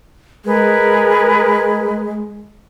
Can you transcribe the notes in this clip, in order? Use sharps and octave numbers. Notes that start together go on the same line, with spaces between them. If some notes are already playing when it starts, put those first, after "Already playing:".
G#3 G#4 A#4 B4